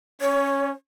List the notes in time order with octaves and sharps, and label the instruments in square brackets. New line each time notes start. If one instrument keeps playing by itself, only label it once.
[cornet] C#4 [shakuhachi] C#5